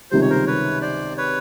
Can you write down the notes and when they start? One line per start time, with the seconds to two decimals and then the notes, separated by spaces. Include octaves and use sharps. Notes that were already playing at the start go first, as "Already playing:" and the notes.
0.11 C#2 C3 D#3 G3 C5
0.22 C#5
0.30 A#4 C5
0.47 B4 C#5
0.82 C5 D5
1.17 B4 C#5